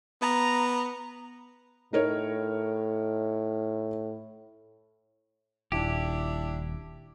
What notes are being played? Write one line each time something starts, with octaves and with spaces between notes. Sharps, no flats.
B3 A#5
A2 D#4 A#4 C#5
D#1 D4 E4 G4